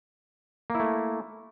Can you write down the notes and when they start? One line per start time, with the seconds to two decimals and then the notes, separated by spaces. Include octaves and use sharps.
0.70 A#3
0.75 E4
0.80 A3